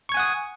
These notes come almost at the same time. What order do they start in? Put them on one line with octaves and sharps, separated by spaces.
C#6 G#6 G#5 F#5 D#6